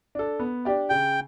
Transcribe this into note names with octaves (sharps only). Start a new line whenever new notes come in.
D4 A4
B3
D4 G4 D5
C#3 G5